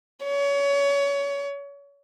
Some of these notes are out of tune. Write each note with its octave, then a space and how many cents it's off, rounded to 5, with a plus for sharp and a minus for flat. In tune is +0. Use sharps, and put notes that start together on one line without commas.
C#5 +30